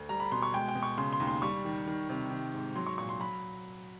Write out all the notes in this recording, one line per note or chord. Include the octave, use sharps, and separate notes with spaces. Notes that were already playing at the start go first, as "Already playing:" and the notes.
Already playing: D2
G3 A#5
B5
B2 C6
C#6
G#3 G5
G5
B2
C#6
C#3 C6
C6
D#2
C6
G3 C#6
D#3
D#3
C3
D#3
G#2
F#3 C6
C#6
A#2 C#6
C6
F#3 B5